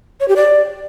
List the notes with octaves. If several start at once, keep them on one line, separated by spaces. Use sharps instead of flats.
C#5
G4
D5